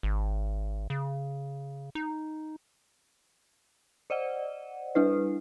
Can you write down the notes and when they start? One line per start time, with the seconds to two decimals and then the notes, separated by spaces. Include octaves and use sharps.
0.03 G#1
0.90 C#3
1.95 D#4
4.10 C5 D5 D#5 F#5
4.95 G3 D4 E4 B4